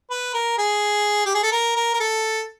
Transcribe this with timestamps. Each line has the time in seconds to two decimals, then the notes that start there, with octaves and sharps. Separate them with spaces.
0.11 B4
0.34 A#4
0.58 G#4
1.26 G4
1.34 G#4
1.43 A4
1.52 A#4
1.76 A#4
1.94 A#4
2.00 A4